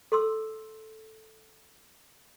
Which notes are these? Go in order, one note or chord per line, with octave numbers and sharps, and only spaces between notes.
A4 C6 E6